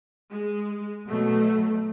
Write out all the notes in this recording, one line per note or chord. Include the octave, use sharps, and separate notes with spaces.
G#3
B2 F#3 A3